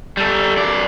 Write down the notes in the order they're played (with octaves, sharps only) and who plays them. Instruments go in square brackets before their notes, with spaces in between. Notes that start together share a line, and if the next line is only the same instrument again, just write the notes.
[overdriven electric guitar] G3 A4
F#2 D5